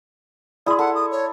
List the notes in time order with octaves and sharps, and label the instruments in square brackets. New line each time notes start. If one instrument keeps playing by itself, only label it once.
[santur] E4 G#4 [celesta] D5 C6 [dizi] D#6
[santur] A4 [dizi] F#5
[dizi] D#6
C#5